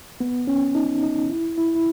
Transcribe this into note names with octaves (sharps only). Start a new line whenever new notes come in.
B3
C#4
D#4
D#4
E4
E4
E4